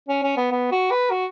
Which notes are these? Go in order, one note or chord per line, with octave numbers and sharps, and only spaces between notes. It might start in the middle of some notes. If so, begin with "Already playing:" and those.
C#4
C#4
B3
B3
F#4
B4
F#4